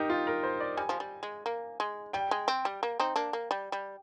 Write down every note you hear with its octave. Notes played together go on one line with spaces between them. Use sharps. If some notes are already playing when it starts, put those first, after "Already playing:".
Already playing: D#4 G4 A#4
F4
A#4
C5
D5
G3 G#5
F3
G3
G#3
A#3
G#3
G3 G5
G#3
C4
G3
A#3
C4 D#4
A#3 D4
A#3
G3
G3